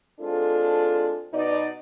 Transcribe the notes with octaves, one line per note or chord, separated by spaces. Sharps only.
G#3 C4 D4 F4 A4
B2 D#4 D5